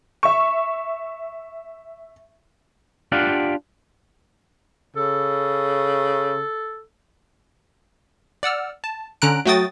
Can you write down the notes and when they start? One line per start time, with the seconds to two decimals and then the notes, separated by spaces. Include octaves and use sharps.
0.23 E5 C#6
3.12 D4 F4 G4 D5 F5 F#5
4.96 C#3 A4
8.43 D5 F#5 E6 F6
8.84 A5
9.22 D3 C#4 A#5 F#6 D7
9.46 F#3 A3 F#4 G5 D#6 A6